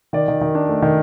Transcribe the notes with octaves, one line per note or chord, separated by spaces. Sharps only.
D#3 D5
D#3
D#3
D4
A3
D#3